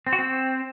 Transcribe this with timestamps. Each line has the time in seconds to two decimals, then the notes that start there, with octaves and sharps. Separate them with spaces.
0.07 C4
0.13 F#4
0.19 C4